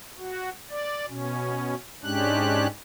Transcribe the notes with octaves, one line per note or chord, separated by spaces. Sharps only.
F#4
D5
B2 C#4
G#2 G#3 C#4 D4 G4 F#6